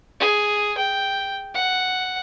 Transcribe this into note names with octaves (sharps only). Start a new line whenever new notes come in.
G#4
G5
F#5